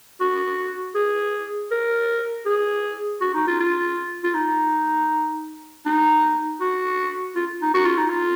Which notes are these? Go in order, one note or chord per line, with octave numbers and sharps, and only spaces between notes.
F#4
G#4
A#4
G#4
F#4
D#4
F4
F4
F4
D#4
D#4
F#4
F4
D#4
F#4
F4
D#4
F4